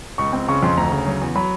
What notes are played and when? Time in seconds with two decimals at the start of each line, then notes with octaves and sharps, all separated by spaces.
0.18 C#2 C#6
0.33 C4
0.48 C#3 C#6
0.62 F2 C6
0.77 D2 A#5
0.92 C#3
1.07 F#3
1.21 E2
1.36 F#3 B5